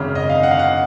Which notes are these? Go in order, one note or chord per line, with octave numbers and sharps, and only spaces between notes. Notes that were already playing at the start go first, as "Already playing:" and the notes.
Already playing: G#1 F#2 C#3 F6
D#5
F5
F#5
F5
F#5